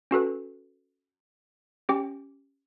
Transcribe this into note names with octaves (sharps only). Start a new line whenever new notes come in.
C#4 F#4 A4 B4
C#4 G4 G5